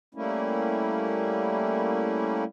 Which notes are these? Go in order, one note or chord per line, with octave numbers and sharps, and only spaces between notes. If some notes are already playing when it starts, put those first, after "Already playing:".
G3 A3 A#3 C#4 E4